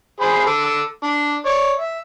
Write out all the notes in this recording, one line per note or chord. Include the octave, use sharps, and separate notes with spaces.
G#4 C5 B5
A4 D6 E6
D4
C#5 D5
E5